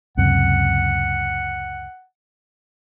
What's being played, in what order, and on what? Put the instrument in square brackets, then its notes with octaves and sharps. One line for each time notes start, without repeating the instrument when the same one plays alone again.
[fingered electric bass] C#2 F#2 C3 [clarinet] F#5